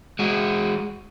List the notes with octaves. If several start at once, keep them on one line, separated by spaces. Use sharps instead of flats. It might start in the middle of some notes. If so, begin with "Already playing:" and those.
G#3 F#4